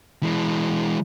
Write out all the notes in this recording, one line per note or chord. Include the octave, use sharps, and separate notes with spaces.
E3 G#3